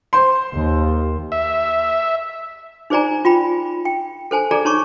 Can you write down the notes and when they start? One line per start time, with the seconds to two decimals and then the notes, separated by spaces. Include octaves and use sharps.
0.13 C5 C6
0.54 D#2
1.32 E5
2.90 D#4 G#4 C5 D5 G#5 A#5
3.25 F4 G5 B5
3.85 G5
4.31 A4 C5 G#5 A5
4.51 G#4 A4 D5 A#5
4.65 D#4 C#5 A5 C#6 D6